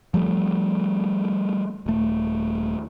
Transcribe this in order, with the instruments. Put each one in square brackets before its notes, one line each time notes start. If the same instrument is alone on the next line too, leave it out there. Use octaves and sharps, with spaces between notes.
[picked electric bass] F3 G3 A3
D#1 A3